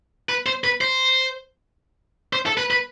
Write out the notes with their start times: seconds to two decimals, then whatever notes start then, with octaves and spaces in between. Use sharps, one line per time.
0.29 B4
0.46 C5
0.64 B4
0.81 C5
2.33 C5
2.46 A4
2.58 B4
2.71 B4